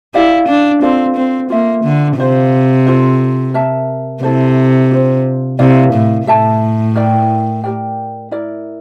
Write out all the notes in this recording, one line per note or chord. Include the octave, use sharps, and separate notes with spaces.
E4 G4 D5 F5
D4
C4 F4 A4 D5 F5
C4
A#3 F4 A4 E5
D3
C3 F4 C5 F5
F4 A4 C5
A#4 E5 A5
C3 E4 A4 C5
D4 F4 C5
C3 E4 A#4 D5 F5
A2
A2 A4 E5 A5
E4 A#4 D5 G5
G4 A#4 D5 G5
E4 A#4 D5